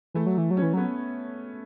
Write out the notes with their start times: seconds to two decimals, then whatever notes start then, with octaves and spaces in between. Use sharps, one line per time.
0.14 E3 A3
0.26 F#3
0.38 E3
0.51 F#3
0.57 C#4
0.62 E3
0.74 F#3 B3